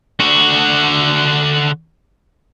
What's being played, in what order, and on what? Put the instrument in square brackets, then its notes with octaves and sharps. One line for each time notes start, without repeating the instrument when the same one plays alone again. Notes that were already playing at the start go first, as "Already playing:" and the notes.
[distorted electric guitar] D3 F#4